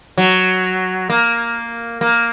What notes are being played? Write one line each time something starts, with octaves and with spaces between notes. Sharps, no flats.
F#3
A#3
A#3